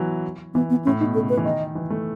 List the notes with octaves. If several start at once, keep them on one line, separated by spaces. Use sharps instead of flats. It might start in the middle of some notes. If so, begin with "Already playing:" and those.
Already playing: E3 F#3
E3 B3
B3
A2 C#4
B2 D#4
C#3 A4
B4
E3
D#3 D#5
E3
A3